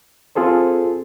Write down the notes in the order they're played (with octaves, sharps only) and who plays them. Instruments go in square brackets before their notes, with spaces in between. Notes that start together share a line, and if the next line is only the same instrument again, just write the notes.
[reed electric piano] C4 F4 G#4 A4 C5